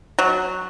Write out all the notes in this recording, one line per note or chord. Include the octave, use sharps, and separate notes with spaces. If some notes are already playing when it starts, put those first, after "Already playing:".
F#3